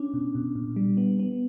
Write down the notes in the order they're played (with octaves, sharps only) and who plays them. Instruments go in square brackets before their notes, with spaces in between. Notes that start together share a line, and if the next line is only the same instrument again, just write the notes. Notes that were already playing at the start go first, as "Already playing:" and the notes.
Already playing: [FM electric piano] C#4 [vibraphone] D4
[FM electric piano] B2
B2
A#2
G3
B3
B3